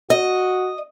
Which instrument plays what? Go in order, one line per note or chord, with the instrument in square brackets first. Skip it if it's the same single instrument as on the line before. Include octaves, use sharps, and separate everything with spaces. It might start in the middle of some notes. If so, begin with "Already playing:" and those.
[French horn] F#4 [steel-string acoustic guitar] D#5